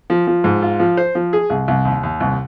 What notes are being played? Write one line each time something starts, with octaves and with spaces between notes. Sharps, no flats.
F3
F3
G#2
F4
F3
C5
F3
G#4
C2
C2
D#2
D#2
C2